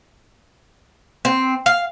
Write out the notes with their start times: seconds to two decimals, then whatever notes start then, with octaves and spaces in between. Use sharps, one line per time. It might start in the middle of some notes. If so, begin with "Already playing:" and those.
1.25 C4
1.66 F5